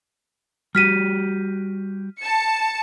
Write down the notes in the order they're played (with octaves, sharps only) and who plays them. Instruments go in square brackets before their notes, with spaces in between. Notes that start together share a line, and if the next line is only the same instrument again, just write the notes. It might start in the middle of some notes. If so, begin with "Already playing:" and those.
[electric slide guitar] G3 F#4 G4 [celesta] F6 B6 D#7
[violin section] A5 C#7